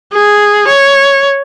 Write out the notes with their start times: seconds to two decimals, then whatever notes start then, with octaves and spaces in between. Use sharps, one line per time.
0.13 G#4
0.68 C#5